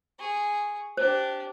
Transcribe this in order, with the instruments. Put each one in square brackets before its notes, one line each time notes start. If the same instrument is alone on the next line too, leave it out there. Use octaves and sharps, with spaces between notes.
[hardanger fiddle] G#4 C#6
[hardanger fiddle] D4 G4 [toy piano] C5